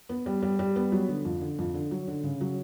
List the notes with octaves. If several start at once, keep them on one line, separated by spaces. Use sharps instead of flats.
B3
G3
G3
G3
B3
F#3
D3
F2
D3
F2
D3
F#3
D3
C#3
F#3